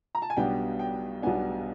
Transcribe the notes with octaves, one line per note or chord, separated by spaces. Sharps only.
A#5
A5
G#5
B1 B2 G3 B3 D4 G5
G5
B1 B2 G3 B3 D4 G#5